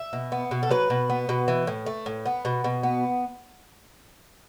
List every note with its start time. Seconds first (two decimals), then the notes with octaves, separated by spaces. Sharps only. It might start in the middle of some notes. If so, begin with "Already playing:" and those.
Already playing: E5
0.13 B2
0.32 B3
0.51 B2
0.63 A4
0.71 F#3 B4
0.90 B2
1.10 B3
1.29 B2
1.48 E3
1.67 A2
1.86 A3
2.06 A2
2.26 B3
2.45 B2
2.64 B2
2.83 B3